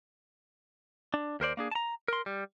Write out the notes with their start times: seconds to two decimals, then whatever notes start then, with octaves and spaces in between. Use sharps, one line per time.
1.14 D4
1.40 D#2 A#4 C5 D5
1.57 A#3 D4 G#4
1.71 A5 A#5
2.08 A#4 C6
2.26 G3